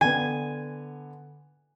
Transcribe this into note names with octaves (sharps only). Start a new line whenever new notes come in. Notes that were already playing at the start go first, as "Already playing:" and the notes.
D3 B3 G#5